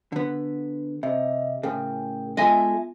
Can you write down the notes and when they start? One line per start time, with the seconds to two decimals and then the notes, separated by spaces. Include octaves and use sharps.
0.12 D3 B3
1.03 C3 D#5 E5
1.63 A2 C#3 G#4 A#4 G5
2.37 G#3 B3 F4 A4 D#5 E5 G#5